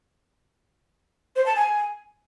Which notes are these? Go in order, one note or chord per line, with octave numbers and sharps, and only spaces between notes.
C5
A5
G#5